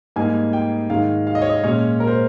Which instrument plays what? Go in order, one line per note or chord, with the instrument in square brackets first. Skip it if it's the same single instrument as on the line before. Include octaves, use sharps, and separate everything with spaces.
[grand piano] G#2 G3 A#3 D#4 G#5
G5
G#2 D#3 G#3 F5
F5
D#5
C#5
D#5
A#2 G#3 C#4 C#5
A#4
C5